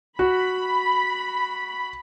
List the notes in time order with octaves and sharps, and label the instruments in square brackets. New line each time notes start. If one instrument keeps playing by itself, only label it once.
[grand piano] F#4 [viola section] B5